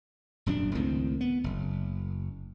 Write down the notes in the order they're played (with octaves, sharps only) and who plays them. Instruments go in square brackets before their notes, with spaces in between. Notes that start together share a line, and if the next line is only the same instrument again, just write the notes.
[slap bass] D#1 F#2 G#3 D4
C#2 A2 D#3 C4
B3
F#1